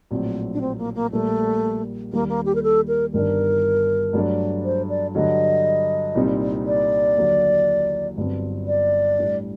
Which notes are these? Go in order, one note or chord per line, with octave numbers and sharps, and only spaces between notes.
A#1 A2 F#3 C4
D4
C4
A#3
A#3
A#1 A#2 G3 A3 A#3
D#2 D#3 G3 A#3
A#3
G4
A#4
A4
A#4
G1 G2 D#3 G3 D4 A#4
G2 F#3 A3 D4
C5
D5
G2 D3 F#3 D#5
C2 A#2 G3 C4 D#4
D5
D#2 D3 F#3
G1 G2 F#3 C4
D5
A2 G3 D4